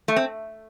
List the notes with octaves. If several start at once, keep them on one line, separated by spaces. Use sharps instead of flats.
A3
C4